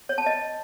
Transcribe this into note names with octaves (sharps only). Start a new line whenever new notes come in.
C#5
A5
D#5